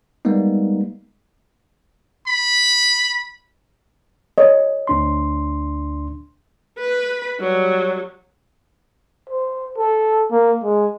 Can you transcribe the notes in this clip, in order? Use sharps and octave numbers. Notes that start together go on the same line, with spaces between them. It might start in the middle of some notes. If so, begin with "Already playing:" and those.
G3 G#3 A#3 B3 D#4
B5
C#5 D#5
D2 D4 C6
B4 B5
F#3 G3
C5
A4
A#3
G#3